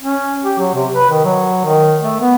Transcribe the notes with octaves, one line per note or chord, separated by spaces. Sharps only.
C#4
G4
F#3
C3
B4
D#3
F#3
D#3
A3
B3